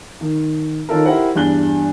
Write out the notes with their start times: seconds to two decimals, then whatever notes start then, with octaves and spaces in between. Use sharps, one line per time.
0.21 D#3
0.89 D#3 C#4 D#4 F4 A4 A#4
1.05 E4 G4 A#4 C5 F#5
1.35 E2 G2 D4 F#6 G7